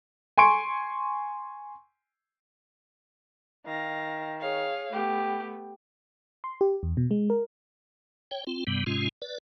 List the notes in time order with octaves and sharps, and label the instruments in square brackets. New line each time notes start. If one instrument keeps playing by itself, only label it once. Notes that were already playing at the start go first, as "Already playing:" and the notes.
[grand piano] G#5 C6 C#6 D7
[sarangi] D#3 [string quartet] F5 A#6
[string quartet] G#4 C#5 F5
[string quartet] A3 B3 [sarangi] G4
[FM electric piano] C6
G4
E2
B2
G#3
A#4
[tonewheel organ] C#5 G5
C4 F4
G2 C3 G3 B3
G#2 C3 G#3 C#4 F4
B4 D5